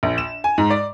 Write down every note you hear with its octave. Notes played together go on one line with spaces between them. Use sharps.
A#1
E7
G#5
G#2
D5